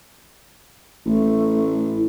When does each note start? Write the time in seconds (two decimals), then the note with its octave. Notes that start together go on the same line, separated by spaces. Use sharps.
1.06 A1 A3
1.83 E4